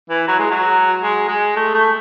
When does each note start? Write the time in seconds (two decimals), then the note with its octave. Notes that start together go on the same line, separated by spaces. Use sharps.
0.10 E3
0.28 F#3
0.39 G#3
0.51 F#3
1.02 G#3
1.28 G#3
1.56 A3
1.74 A3